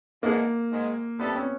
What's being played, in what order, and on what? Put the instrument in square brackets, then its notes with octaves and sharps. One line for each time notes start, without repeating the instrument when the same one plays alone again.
[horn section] G#2 E3 G#3 B3 D4 [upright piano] A#3
[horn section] G#2 D#3 G#3
[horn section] G3 C4 E4 A4 [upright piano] B3
[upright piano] C#4